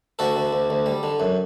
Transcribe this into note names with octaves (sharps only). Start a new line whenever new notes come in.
D2 F#4 A4
D2
D2
D2
G3
D3
F#2